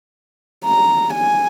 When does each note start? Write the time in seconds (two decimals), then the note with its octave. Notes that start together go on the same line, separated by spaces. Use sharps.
0.65 A#5
1.14 G#5